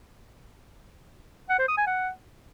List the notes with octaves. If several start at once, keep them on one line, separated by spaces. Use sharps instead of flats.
F#5
C5
D#6
G#5
F#5